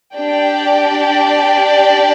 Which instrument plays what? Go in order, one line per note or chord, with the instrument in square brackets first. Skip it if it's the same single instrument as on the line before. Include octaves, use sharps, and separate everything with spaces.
[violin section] D4 G4 D5 G5